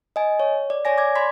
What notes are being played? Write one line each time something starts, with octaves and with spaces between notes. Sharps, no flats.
D#5 G#5
C#5
D5
C#5 D5 G#5 A#6
D6 G#6
D5 B5 C6 G#6 B6